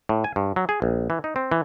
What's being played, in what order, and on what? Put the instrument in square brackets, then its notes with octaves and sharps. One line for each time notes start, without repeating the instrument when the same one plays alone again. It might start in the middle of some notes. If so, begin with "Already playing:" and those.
[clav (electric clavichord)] A2
G#5
G2
F#3
G#4
A#1
E3
D#4
C4
E3